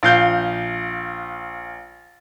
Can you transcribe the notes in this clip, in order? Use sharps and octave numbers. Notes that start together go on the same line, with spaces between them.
A#1 F5 G6 G7